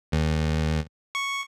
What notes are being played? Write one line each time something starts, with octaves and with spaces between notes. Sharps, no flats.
D#2
C#6